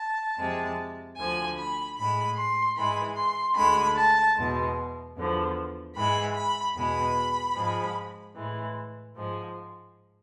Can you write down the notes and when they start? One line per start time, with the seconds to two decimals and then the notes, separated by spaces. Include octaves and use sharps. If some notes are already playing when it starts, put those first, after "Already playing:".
Already playing: A5
0.37 F2 C3 G#3
1.16 D2 D3 F3 G#5
1.56 B5
1.96 A2 G#3 B5
2.36 C6
2.76 G#2 E3 G#3 B5
3.16 C6
3.56 D2 D3 G#3 B5
3.96 A5
4.36 E2 B2 G#3
5.15 E2 D3 F3
5.95 G#2 E3 G#3 B5
6.35 B5
6.74 E2 B2 G#3 B5
7.55 G#2 F3 G#3
8.34 A2 E3 G#3
9.15 G#2 F3 G#3